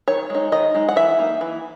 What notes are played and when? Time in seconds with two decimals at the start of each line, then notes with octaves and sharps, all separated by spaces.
0.08 D#3 C#5
0.30 G#3 D#4
0.52 D#3 D#5
0.74 G#3 D#4
0.89 F#5
0.96 E3 E5
1.19 A#3 D#4
1.41 E3